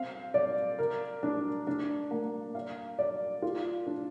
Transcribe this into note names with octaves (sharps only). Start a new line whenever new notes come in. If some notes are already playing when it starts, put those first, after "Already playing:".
Already playing: C4 F5
D5
A#4
D4
D4
A#3
F5
D5
F4
D4